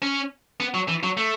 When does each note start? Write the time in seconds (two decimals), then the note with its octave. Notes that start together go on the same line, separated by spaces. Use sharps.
0.02 C#4
0.60 B3
0.74 F#3
0.88 E3
1.03 F#3
1.17 A3